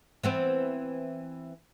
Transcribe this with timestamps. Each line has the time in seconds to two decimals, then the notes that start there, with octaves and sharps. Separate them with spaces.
0.23 E3 B3 C4